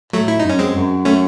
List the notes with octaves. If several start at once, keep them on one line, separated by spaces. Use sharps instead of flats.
A2 F#3 A3
E4
F#2 D#4
C#4
G#3 C4
F#2
A3 C#4